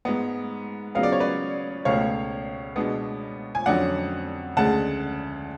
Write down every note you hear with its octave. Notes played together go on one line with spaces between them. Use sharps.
G#2 G#3 B3
C#3 F#3 B3 F5
D5
C#5
B4 D5
C#2 B2 A3 C#5 F5
B2 G#3 B3 D4
G#5
F2 D3 F#3 C#4 D5 F#5
D2 C#3 G#3 F#5 A5